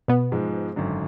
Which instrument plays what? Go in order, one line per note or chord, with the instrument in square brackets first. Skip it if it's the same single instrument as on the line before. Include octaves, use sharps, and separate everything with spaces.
[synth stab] B2 B3
[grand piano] G#2 F3 G#3
G#1 F#2 D3